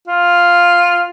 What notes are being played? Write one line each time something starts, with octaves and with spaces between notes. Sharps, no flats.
F4